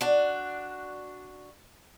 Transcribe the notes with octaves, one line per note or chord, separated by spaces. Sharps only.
D4 F#4